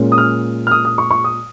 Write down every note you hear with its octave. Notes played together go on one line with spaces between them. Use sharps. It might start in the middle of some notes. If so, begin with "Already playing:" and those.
Already playing: A#2 G#3 C#4
D#6
F6
F6
D#6
D#6
C#6
C#6
D#6